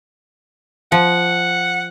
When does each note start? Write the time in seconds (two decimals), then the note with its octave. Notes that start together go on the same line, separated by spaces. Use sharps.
0.92 F3 F#5